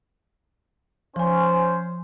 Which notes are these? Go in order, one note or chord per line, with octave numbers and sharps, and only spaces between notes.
F3 C#4 C5 G#5